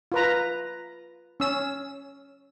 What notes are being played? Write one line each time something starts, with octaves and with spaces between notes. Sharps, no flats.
F4 B4 A#5
C#4 E6